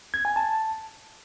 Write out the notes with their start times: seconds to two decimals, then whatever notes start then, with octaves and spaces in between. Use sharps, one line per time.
0.14 G#6
0.25 G#5
0.36 A5